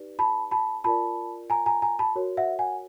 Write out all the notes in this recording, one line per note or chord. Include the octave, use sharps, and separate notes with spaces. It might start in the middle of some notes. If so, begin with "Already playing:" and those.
Already playing: D#4 G4 B4 D5
A5 B5
A5 B5
F4 A#4 D5 A5 B5
G#5 A#5
G#5 A#5
G#5 A#5
A5 B5
F#4 A#4 C#5
E5 F#5
F#5 G#5